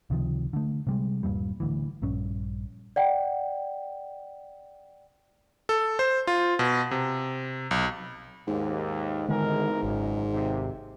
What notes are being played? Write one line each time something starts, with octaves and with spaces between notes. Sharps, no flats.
C#2 C3 D#3 F3
D3 A3
C3 G3 G#3
D#1 G2 A#2 G3
D1 D2 E3
A#1 G2 C#4
D5 F#5 G5
A4
C5
F4
B2
C3
B1
D#2 G#2
G#1 E2 D3 D#3 G#3 A#4
G#1 C#2 F#2
D#2 C3